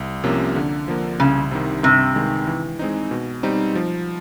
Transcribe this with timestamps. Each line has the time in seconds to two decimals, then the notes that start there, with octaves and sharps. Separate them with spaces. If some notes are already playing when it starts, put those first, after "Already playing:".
Already playing: C2
0.24 C3 F3 A#3 C#4
0.56 D3
0.88 F3 A#3
1.20 C2 C#3
1.51 C3 D#3
1.83 G2 C3
2.16 D#3 G#3
2.47 E3
2.79 G#3 C4 D#4
3.11 B2
3.43 G3 C4 D#4
3.75 F3